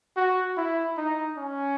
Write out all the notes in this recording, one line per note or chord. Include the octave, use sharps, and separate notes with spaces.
F#4
E4
D#4
C#4